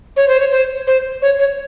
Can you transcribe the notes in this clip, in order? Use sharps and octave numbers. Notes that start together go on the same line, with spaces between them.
C#5
C5
C#5
C5
C5
C#5
C#5